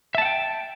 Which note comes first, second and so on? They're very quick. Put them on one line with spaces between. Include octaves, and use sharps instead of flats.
E5 A5 F#5 G5